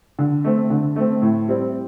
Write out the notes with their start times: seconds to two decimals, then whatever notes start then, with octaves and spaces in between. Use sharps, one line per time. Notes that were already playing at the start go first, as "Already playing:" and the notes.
0.19 D3
0.44 A3 C4
0.70 D3
0.96 A3 C4
1.22 A2
1.48 G3 C4 E4